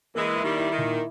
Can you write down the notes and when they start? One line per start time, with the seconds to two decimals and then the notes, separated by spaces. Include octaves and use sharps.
0.15 E3 G#3 A#3
0.36 E4
0.43 D#3 G3
0.58 E4
0.71 D#3
0.78 A#2